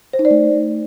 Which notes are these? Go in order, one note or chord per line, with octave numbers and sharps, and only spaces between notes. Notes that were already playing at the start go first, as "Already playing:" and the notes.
C5
D#4
D5
A3